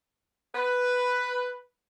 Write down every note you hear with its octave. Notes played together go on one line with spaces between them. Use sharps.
B4